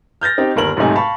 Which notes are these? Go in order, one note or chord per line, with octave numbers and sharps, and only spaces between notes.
F6 G6 A6 A#6
C4 D#4 G4 G5
G1 D#2 A#4 F#7
B1 G#2 C3 A3 D#4 G#5
F5 A5 B5 C#6